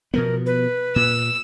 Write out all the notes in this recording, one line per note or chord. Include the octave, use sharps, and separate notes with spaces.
B2 F3 B3 A#4
B4
A#2 E6